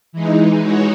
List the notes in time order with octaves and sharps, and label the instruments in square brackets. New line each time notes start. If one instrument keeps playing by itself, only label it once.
[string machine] E3 G#3 D#4
E3 G#3 D#4 F#4 C#5